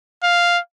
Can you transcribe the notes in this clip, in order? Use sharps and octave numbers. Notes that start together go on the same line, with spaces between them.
F5